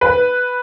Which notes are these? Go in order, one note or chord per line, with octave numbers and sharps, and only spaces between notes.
B4